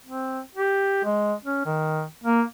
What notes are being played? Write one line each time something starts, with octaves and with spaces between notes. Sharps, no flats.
C4
G4
G#3
C#4
D#3
A#3